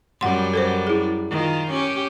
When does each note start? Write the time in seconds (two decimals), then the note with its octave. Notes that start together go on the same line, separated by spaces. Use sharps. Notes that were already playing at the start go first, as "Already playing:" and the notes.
0.21 F#2 G3 F#5 C6
0.54 A4 A#4 C5
0.87 E4 G#4
1.30 D#3 F4
1.71 C#4 G4